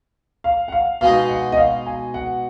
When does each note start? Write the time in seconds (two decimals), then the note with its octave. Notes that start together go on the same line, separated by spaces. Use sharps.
0.44 F5
0.68 F#5
0.72 F5
1.01 B2 G#3 D#4 F5
1.29 F#5
1.52 D#5
1.57 F5
1.86 G#5
2.14 F#5